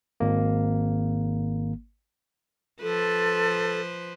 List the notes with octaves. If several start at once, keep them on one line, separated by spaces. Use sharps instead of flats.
G#1 A#3
F3 A4 B4 C5